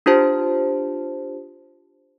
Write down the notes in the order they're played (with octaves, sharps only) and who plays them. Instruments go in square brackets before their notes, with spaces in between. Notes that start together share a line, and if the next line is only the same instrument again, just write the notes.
[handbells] D4 F4 G4 C5 A5